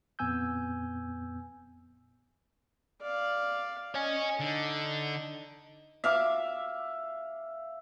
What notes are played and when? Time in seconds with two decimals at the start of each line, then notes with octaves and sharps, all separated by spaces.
0.19 F2 A#2 B3 G#5 E6 G6
3.02 D5 F5
3.95 C#5 D#5 G#5
4.40 D3 D#4
6.04 E5 F5 D6